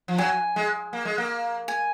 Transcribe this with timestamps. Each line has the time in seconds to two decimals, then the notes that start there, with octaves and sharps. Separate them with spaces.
0.08 F3
0.18 F#3 G#5
0.56 G#3
0.93 A#3
1.05 G#3
1.18 A#3
1.68 G#5